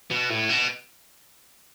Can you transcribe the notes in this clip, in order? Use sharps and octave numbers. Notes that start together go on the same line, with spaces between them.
B2
A2
B2